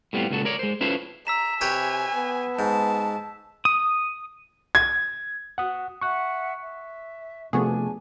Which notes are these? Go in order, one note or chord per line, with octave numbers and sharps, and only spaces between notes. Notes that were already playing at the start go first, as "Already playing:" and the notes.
A2 G3 B3 C4 F4
C#2 A#2 F#4 A4
A#4 C#5 D5
G#3 C5
C#4 E4 F4 A4 B4 C5
A#5 E6 B6 E7
C3 G4 B4 C#5 G#5
B3
G#2 A5
D#6
G#6
F#4 F#5 D#6
E5 F#5 C#6 F#6
E5
C3 F3 A3 B3 D4 F#4 G#4 G#5